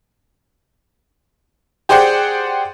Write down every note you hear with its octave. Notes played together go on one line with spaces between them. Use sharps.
G4 G#4 C5 D5 F#5 G5